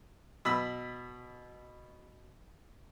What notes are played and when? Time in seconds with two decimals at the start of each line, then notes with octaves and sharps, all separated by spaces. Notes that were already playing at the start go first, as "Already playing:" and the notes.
0.45 B2 B5 E6